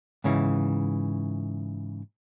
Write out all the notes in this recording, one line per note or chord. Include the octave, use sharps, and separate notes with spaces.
G#2 C#3 E3